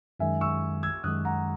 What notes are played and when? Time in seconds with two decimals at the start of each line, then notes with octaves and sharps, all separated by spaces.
0.20 F#2 D#3 G#3 E5 G#5
0.41 C#6 E6
0.83 E6 G#6
1.04 F#2 D#3 G#3 D#6 F#6
1.25 F#5 A#5